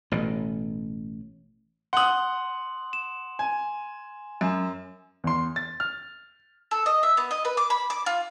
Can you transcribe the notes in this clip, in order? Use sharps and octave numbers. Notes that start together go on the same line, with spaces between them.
A1 B2
F#5 C6 D#6 F#7
E7
G#5
F#2
E2 C6
A6
F6
A4
D#5
E5
B3
D#5
B4
D6
B5
D6
F4